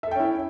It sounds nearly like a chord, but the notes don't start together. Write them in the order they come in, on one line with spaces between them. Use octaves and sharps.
E5 A4 G5 C#4 E4